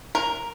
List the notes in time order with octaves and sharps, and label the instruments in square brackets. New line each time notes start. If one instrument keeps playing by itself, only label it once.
[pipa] A#4